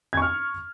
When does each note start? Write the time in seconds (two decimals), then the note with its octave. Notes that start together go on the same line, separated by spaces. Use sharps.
0.13 G#6
0.17 C#6
0.22 F6